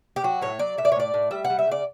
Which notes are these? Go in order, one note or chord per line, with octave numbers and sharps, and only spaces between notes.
G4
F#3 F#4
A2 C#5
F#3 D5
A2 E5
D5
C#5
A2 D5
A2
G3 E5
F#5
G3
E5
C#3 D5